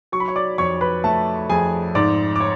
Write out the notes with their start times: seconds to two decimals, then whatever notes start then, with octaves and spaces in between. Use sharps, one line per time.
0.12 F#3 C#6
0.20 B5
0.28 C#5 C#6
0.36 D5 D6
0.58 F2 C#5 C#6
0.81 B4 B5
1.04 A3 A4 A5
1.49 F2 G#4 G#5
1.95 G#2 D5 D6
2.36 D6
2.40 C#5